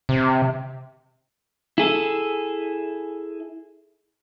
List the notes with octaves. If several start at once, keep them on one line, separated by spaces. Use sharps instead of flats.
C3
E4 G#4 A4